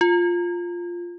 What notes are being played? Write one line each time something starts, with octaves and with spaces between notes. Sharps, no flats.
F4